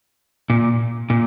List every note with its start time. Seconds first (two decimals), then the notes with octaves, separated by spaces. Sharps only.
0.50 A#2
1.10 A#2